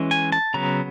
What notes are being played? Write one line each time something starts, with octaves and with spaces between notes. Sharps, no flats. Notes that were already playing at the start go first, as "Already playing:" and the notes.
Already playing: E3 G#3 C#4
G#5
A5
C#3 F#3 B3 A#5